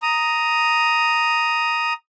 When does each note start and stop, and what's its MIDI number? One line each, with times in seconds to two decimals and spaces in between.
0.02 1.93 82
0.02 1.93 87